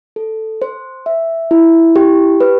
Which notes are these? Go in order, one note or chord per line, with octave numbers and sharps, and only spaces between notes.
A4
C5
E5
E4
G4
B4